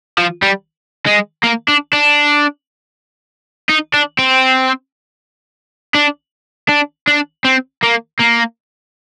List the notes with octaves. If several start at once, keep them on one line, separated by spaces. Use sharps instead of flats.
F3
G3
G#3
A#3
D4
D4
D#4
D4
C4
D4
D4
D4
C4
A#3
A#3